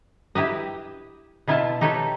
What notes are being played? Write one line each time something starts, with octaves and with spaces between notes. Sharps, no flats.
E4 G4 B4 D#5
B2 B3 E4 F4 F5 A5
D#4 G4 A4 B4 C#5